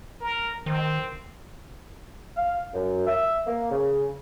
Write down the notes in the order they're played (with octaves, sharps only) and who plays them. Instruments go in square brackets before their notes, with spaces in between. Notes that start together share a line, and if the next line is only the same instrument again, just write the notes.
[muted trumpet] A#4
[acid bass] D#3 [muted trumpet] C4
[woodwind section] F5
F#2
E5
A#3
C#3